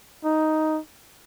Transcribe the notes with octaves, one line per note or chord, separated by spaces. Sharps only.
D#4